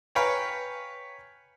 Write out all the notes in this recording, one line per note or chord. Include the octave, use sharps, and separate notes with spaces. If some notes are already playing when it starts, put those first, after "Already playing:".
B4 C#5 F5 G5 G#5 A#5